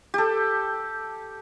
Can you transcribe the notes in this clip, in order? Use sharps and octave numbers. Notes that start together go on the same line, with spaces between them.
G4 A4